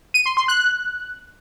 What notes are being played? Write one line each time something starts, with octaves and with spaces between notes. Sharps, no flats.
D#7
C6
C6
F#6
F#6